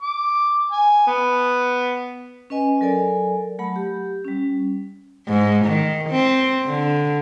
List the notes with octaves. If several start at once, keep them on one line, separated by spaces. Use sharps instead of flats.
D6
G#5
B3
C#4 B4 D#5 G#5
F#3 A4 A#4 D5 G#5
F#3 A3 F#5 B5
G4
G3 C#4
G#2
D#3
C4
D3